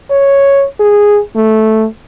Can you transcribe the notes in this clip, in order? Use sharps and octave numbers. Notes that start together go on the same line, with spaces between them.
C#5
G#4
A3